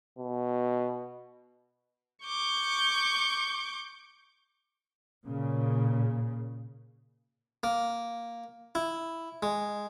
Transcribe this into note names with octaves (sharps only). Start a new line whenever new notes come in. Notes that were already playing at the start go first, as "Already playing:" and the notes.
B2
C#6 D6 G6
A#2 C#3
A#3
E4
G#3